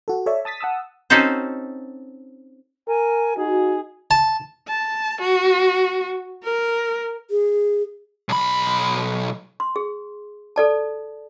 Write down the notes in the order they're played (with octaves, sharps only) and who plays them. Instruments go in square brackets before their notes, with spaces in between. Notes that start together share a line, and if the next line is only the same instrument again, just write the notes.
[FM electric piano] F#4 A4
A4 C#5 D5 E5
A5 D#6 A6 B6
F#5 A5 D#6 E6
[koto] C4 C#4 D#4 F#4 A4 C5
[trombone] A#4 [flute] G#5
[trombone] D#4 [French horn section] F#4 [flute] G#4
[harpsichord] A5
[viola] A5
F#4
A#4
[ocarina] G#4
[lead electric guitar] B1 B5
[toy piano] C6
G#4
A4 D5 A5